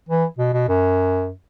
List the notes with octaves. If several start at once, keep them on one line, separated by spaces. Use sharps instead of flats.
E3
B2
B2
F#2